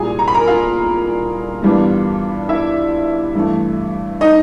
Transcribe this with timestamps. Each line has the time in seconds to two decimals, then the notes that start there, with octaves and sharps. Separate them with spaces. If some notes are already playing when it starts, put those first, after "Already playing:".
Already playing: C2 A#2 G3 G#4 G#5
0.19 A#5
0.28 B5
0.35 A#4 A#5
0.47 F4 F5
1.62 G2 E3 G3 B3 D4
2.49 E4 E5
3.35 G2 E3 A3
4.21 D#4 D#5